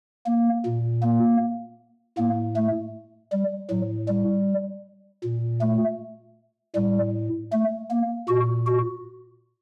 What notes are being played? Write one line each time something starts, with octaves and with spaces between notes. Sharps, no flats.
A#3
A#2
A#3
A2 A#3
A3
G3
A2 F#3
G3
A#2
A3
A2 G3
A3
A#3
A#2 F#4
F#4